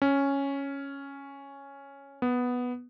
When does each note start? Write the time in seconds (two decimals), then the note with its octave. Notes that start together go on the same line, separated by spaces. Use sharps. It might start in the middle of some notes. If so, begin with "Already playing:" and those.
0.02 C#4
2.22 B3